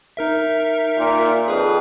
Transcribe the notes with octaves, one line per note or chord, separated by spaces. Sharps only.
D#4 A#4 E5
A#2
F2 G#4 B4